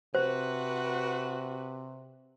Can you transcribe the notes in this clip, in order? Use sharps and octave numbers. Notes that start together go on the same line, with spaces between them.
C3 F#4 B4 C5